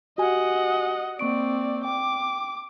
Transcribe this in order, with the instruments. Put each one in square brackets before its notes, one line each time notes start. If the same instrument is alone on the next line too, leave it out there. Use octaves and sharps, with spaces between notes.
[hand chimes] F#4 G4 G#5 [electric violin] D#5 F#5
[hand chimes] A#3 C#6 D7 [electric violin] C4 D5
[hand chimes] G5 [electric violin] D6